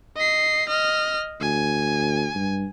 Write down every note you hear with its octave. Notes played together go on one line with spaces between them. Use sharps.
D#5 C7
D#5 F6
D2 G#5
G2